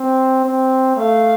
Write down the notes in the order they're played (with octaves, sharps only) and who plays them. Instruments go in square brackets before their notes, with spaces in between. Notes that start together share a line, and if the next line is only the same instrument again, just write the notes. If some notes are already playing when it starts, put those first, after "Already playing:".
Already playing: [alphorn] C4
C4
[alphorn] A3 [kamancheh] F5